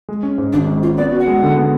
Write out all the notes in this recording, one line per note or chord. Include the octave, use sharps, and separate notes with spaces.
G#3
C#4
G#2
G#1 D4
G#3
C#4 F4
B3 D5
F#4
F#5
G#3
D3
B3